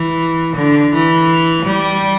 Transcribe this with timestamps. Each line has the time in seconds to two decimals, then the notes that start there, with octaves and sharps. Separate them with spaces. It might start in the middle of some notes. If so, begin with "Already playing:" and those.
Already playing: E3
0.56 D3
0.93 E3
1.66 G3